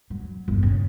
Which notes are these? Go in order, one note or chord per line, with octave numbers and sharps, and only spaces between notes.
F#3
G1 E2
C#3